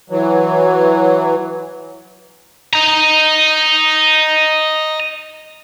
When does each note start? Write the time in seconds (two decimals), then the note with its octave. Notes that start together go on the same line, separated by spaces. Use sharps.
0.10 E3 F#3
2.74 D#5 A#5